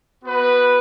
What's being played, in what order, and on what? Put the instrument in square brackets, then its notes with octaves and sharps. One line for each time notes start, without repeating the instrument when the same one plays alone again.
[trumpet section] B3 F#4 B4